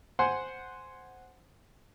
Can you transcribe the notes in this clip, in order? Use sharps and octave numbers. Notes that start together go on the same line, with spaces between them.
C5 F#5 G#5 C6